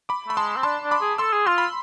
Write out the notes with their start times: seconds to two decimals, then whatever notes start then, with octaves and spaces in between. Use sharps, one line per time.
0.09 B5 D6
0.27 A3 B5
0.36 G#3 A5 C6
0.56 C4
0.63 D4 A5 C6
0.83 D4
0.91 B5 D6
1.01 G#4
1.18 A4 C6 E6
1.33 G#4
1.47 F4 C6
1.58 B5